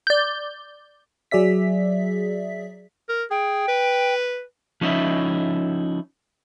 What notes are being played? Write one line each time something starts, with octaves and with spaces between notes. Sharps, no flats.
D5 G6
F#3 G#4 D5 E5 B6
A#4
G#4 G5
B4
F3 C#4 D#4 E4 E5